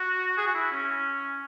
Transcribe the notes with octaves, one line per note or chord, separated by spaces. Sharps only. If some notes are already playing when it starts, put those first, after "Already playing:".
Already playing: F#4
G#4
F#4
E4
C#4